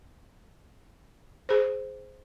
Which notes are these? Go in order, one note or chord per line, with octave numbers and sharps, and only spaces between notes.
G#4 C5